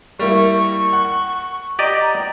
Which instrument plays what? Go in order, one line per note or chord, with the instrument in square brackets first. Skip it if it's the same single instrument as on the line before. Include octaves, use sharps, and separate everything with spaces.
[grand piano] G3 A#3 E4 [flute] C#6
[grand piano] F#5
[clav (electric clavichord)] G4 D5 D#5 [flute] A#5